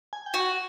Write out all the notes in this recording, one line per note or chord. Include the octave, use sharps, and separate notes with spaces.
G#5
G5
F#4
F#5